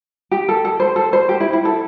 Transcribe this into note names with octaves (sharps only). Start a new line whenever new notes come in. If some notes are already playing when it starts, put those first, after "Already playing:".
G4
A4
A4
C5
A4
C5
G4
E4
E4
A4